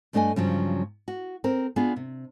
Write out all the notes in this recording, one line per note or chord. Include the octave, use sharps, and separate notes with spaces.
G2 A3 D4 G4 D#5 G#5
G2 C#3 F3 F#3
F#4
C4 A#4
B3 D4 F4 G#4
C3